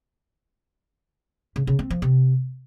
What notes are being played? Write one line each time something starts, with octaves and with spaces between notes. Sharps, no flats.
C#3
C#3
C4
F3
C3